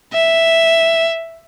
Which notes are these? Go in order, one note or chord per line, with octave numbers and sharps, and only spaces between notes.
E5